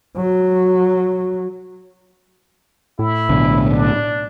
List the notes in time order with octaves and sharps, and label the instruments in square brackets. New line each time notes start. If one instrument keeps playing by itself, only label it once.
[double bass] F#3
[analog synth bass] A2 [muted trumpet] E4
[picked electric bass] B1 B2 D3
[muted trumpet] D4